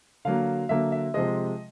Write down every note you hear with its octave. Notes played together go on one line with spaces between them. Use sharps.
D3 F#3 A#3 F5
D3 F#3 A#3 E5
E5
C3 F3 G#3 D#5